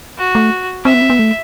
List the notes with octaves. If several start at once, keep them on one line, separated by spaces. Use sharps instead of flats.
F#4
A3
C4 E5
B3
C4
B3
A3